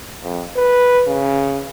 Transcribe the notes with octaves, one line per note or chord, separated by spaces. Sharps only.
F2
B4
C#3